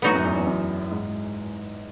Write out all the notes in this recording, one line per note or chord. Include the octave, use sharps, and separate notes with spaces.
A2 F#3 B3 D#4 F#4
F#2
E2
E2
F#2
G#2